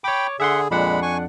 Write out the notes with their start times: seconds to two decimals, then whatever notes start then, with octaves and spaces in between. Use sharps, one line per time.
0.04 C#5 G5 B5 D6
0.40 D3 G#4 E5 F#5 C6
0.71 F2 A#2 G#3 D4 F#5 B5
1.02 G#5 C#6